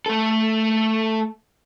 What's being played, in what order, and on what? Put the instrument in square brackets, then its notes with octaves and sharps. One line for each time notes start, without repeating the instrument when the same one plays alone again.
[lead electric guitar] A3 A4